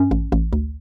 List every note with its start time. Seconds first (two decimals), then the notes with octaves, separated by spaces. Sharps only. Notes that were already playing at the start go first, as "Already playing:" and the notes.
Already playing: G2 C#4
0.11 A1
0.32 A1
0.53 D2